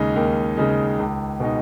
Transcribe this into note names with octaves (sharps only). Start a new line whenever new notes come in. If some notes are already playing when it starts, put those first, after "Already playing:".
Already playing: D#2 C#3 G#3 D#4
D#2 A#4
C#3 G#3 D#4
C#2
B2 G#3 D#4